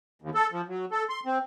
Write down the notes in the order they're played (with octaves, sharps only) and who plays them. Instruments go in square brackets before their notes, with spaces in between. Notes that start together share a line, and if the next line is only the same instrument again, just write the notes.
[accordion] D#2
A4
F3
F#3
A4
C6
C4